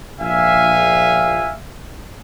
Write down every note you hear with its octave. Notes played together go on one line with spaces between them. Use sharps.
A#1 E5 F5 G#5